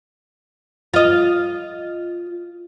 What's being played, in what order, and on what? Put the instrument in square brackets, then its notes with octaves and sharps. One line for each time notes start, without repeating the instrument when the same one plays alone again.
[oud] F4 D#5